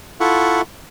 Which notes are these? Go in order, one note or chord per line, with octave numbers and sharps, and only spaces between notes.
E4 F4 A4 E5 F#5 C#6